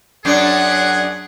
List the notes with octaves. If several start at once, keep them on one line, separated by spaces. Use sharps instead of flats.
F#2 D4 G#4 F#5